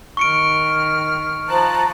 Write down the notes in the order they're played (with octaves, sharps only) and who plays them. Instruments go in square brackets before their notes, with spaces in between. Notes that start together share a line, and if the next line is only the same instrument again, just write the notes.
[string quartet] D#3 F6 [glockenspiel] C#6 C#7 D7
[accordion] F3 A5 F#6 [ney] A#5